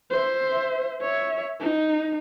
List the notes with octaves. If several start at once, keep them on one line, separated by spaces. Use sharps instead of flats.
C5 E5
C#5 E5
D#4